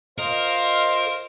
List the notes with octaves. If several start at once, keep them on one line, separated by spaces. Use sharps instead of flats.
F4 A#4 C5 D#5 F5